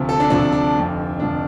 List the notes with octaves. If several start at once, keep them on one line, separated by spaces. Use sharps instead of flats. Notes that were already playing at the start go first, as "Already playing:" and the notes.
Already playing: D2 C3 F3
A4
D4
D2 C3 F3 D4
D4
F1 F2 D3 F3
F1 F2 D3 F3 D4